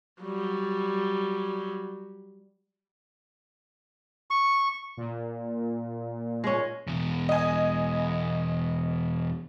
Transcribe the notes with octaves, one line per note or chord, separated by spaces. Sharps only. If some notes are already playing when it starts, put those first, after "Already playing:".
F#3 G3
C#6
A#2
G#3 C#4
E2 B2
D#5 G#5